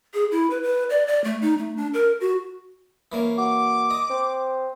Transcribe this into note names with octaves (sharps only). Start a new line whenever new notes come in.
G#4
E4
B4
B4
D5
D5
A3
D#4
A3
D4
A#4
F#4
E3 A#3 C#4
F#4 D6
D#5
C4